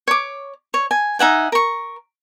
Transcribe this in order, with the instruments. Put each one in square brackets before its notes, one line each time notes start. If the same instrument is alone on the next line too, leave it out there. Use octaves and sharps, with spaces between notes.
[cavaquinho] C#5 D6
C#5
G#5
D#4 E5 F#5 G#5
A#4 C#6